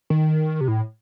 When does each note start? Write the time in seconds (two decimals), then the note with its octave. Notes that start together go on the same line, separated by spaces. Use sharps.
0.10 D#3
0.61 C3
0.68 A2